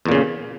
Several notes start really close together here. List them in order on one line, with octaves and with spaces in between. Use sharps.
E2 A#2 C#3